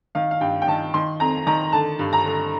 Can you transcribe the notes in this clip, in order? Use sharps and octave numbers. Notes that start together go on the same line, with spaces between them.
D#3 F5
F5
G2 G5
G5
D#3 A5
D#3 C6
F2 A#5
D#3 A#5
D3 A5
G2
A#5
D3